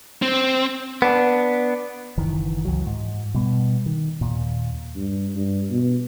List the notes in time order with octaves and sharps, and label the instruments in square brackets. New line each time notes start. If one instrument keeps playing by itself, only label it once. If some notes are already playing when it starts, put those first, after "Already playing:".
[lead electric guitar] C4
[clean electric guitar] B3 D4
[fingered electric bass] F#1 D#3 E3
C#2 E3 F#3
G#2
B2 G3 B3
D#3
D#2 A#2
[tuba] G2
G2
B2